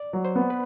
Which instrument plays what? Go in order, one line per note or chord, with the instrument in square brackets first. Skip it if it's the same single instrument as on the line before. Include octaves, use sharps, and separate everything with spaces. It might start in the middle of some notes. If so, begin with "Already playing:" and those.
Already playing: [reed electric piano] D5
[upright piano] F#3
[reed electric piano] C5
[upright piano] B3
[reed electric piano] B4